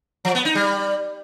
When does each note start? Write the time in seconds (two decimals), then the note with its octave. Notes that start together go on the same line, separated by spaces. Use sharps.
0.25 F3
0.35 B3
0.45 D#4
0.55 G3